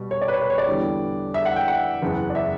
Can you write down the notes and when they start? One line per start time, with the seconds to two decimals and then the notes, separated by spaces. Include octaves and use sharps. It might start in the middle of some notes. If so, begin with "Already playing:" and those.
Already playing: B2 G3
0.11 C#5
0.22 D5
0.28 B4
0.33 C#5
0.41 B4
0.50 C#5
0.58 D5
0.67 E2 D3 G3 B3
1.34 E5
1.45 F#5
1.56 G5
1.68 F#5
2.02 F#1 E2 C#3
2.30 D5
2.35 E5